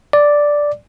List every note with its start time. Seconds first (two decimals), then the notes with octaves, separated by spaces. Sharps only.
0.13 D5